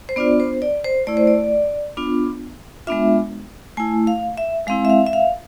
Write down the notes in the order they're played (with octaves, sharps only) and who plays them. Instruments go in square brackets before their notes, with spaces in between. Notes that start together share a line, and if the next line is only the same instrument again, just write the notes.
[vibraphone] C5
B3 D4 F4 D5
C5
D5
C5
A3 E4 D5
C5
D5
B3 D4 F4
G#3 B3 D4 F4 E5
A3 E4 G#5
F5
E5
G#3 C4 E4 F5
E5
F5
E5
F5